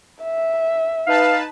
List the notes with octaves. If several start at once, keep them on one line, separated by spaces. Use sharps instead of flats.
E5
D#4 B4 F5 A5